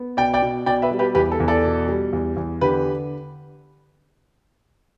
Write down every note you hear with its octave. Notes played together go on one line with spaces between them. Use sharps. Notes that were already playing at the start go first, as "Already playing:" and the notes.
Already playing: B3
B2 D5 G5
D5 G5
B2
B2 D5 G5
B4 E5
G3
G4 B4
E2 G4 B4
A4
E2
A4 D5
B2
G3
E2
E2
D3 G4 B4